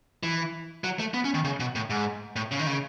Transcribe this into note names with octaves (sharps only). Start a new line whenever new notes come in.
E3
F#3
A3
B3
C#4
D#3
C#3
B2
A2
G#2
A2
C#3
D#3
C#3